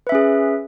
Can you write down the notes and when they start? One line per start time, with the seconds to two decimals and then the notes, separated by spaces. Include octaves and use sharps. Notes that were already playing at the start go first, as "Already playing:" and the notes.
0.07 B4
0.09 E5
0.12 C#4
0.15 G#4